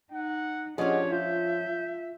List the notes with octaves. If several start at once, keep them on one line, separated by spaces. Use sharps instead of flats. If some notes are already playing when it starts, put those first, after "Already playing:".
D#4 F#5
F3 C#4 D4 G4 G#4 C#5 D#5 F#5
F4 E5 G6